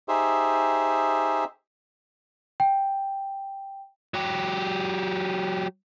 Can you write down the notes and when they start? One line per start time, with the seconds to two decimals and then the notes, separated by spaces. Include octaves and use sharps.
0.08 D#4 G4 G#4 C5 E5
2.60 G5
4.14 F#3 G4